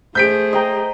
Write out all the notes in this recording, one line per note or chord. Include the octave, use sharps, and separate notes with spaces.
A3 G#4 C5 G6 B6 D7
D#5 G5 A#5